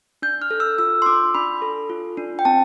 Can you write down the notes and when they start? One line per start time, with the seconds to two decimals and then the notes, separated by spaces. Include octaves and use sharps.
0.22 D4 G6
0.42 F6
0.51 A4
0.60 E6
0.78 F4 E6
1.02 C6
1.06 D4 D6
1.34 D4 B5
1.62 A4
1.89 F4
2.17 D4
2.39 G5
2.45 C4 A5